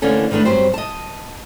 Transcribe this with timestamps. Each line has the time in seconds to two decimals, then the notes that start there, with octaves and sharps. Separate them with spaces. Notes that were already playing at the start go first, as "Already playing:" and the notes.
0.02 D2 D3 E3 A#3 C#4 A4
0.31 D#3 E3 A3 D4 B4
0.45 G2 F#3 C4 G4 B4 C5
0.74 D#5 A5